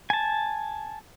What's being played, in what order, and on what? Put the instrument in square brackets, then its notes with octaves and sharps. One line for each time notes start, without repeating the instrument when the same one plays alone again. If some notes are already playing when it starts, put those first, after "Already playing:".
[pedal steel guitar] G#5 A5